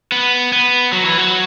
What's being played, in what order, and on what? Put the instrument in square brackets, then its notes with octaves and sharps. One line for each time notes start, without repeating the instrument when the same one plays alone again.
[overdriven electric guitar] B3
B3
F#3
E3
F#3